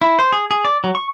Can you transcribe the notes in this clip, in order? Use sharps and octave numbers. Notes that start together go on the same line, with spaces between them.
E4
C5
G#4
G#4
D5
F#3
C#6